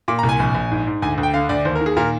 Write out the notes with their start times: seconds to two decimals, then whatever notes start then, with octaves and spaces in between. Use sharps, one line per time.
0.08 A#2 D6
0.19 A#5
0.23 C2
0.29 G#5
0.40 A#1
0.55 A#1
0.71 G#2
0.87 G#2
1.02 D2 G#5
1.18 D2
1.23 G5
1.34 D3 F5
1.49 D2 D5
1.65 D#2 C5
1.75 A#4
1.81 D#3
1.86 G#4
1.97 A#2 A#4